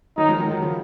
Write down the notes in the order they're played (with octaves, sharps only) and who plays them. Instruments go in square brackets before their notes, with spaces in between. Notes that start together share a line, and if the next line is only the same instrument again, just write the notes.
[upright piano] D#3 F#3 [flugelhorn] D#4
[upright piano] F3 G#3
D#3 F#3
D#3 F#3
C#3 F3